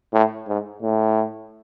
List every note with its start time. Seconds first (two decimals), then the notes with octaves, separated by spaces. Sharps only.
0.13 A2
0.48 G#2
0.82 A2